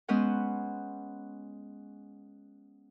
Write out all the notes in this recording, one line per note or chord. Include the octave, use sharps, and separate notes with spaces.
G#3 B3 C#4 B4 C5 F#5